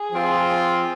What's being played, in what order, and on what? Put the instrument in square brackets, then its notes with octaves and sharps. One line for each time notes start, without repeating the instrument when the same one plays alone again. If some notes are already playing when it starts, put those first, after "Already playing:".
Already playing: [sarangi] G#4
[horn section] F3 C4 F4